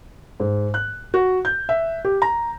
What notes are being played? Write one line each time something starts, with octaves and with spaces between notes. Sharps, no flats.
G#2
F#6
F#4
G6
E5
G4
A#5